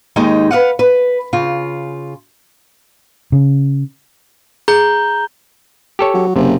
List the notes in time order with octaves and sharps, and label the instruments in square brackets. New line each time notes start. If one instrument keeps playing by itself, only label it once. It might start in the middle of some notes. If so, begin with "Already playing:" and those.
[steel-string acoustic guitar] D#2 G#3 D#4 D#5 G5
B4 D#5 F5 F#5
B4
C#3 F4
[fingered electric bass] C#3
[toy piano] G#4 [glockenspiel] A#5 G6 G7
[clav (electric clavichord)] G4 A4 C#5
[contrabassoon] F#3
[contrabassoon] F#1 [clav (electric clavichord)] C3